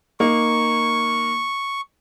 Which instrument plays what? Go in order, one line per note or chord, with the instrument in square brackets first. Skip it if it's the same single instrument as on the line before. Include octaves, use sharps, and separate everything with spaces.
[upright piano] A#3 D#4 [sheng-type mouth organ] C#6